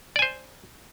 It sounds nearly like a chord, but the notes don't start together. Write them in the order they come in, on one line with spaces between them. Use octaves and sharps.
D5 G#5 C5